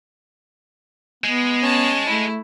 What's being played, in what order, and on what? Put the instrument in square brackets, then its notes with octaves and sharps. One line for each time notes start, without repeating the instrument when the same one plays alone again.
[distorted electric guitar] G#3 [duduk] B3
[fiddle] C#4 A5
[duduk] A3 [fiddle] E4